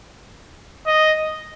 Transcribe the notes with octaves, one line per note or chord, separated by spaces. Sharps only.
D#5